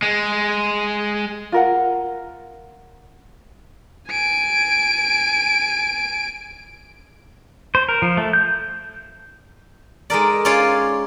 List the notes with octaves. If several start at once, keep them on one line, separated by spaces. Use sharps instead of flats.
G#3
F4 A#4 F#5
G#5 D7
C5
A#4
F3
A3
G6
G#3 D#4 A#4 D5
C#4 F4 G#4 C#5 D5 F5